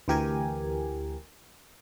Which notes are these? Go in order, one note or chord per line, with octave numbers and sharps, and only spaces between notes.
D2 E3 G4 A#4 G#5